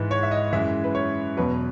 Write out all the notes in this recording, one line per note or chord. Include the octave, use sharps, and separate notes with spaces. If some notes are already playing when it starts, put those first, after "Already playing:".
Already playing: G#2 E3 G#3 B4
C#5
E5
D#5
F#2 E3 G#3 E5
B4
C#5
E2 B2 F#3 B4